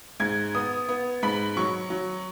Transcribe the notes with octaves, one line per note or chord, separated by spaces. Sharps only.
G#2 G#6
B3 D#6
B3
G#2 B5
F#3 C#6
F#3